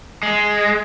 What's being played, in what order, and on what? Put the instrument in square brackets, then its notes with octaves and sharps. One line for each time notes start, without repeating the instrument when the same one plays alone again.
[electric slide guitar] G#3